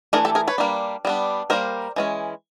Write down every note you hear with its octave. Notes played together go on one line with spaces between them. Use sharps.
E3 A3 D4 G#4 A#4
G4 A4
G#4 A#4
B4 C#5
G3 A#3 D4
G3 B3 D4
G3 A#3 D#4 A#4 C5
E3 G#3 C#4